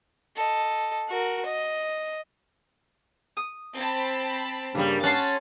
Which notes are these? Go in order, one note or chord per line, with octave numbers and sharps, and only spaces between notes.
A4 D#5
F#4 A#4
D#5
D#6
C4 A5 B5
G2 C#3 G3 A#3
C#4 F#5 A5 C6 A6